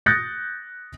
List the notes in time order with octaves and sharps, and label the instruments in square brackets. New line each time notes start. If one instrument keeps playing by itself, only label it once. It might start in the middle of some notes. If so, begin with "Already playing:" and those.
[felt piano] D#6 F#6 G6 A6 A#6 C#7